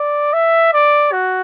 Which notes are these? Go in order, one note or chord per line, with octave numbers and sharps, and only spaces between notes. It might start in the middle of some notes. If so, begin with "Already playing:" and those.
Already playing: D5
E5
D5
F#4